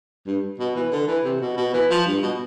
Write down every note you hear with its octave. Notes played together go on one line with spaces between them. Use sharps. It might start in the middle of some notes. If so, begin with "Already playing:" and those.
G2
B2
E3
D3
E3
C3
B2
B2
E3
F3
G2
B2